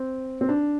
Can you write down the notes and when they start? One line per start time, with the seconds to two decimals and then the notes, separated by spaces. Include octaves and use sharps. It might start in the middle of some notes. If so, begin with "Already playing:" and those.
Already playing: C4
0.41 C4
0.49 D4